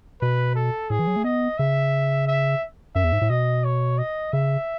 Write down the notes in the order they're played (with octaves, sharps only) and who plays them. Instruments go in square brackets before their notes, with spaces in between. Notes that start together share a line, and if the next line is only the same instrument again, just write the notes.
[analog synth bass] B2 [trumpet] B4
[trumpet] A4
[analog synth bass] A2 [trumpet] G#4
[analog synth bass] E3
F#3
A3
[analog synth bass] B3 [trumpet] D#5
[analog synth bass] C#3 [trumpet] E5
[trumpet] E5
[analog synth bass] F#2 [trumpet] E5
[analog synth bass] E2
G#2
A2
[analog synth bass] B2 [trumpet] D#5
[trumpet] C#5
D#5
[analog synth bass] C#3 [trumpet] E5